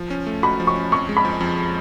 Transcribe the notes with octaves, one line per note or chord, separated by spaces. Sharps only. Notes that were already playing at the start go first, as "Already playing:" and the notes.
Already playing: F3
C#4
A3
F#4 B5
F3
C#6
C#4
F2 C#6
G#3
B5
F3
F2